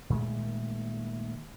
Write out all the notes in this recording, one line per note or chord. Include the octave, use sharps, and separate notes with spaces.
A#2 D#3 G#3 A3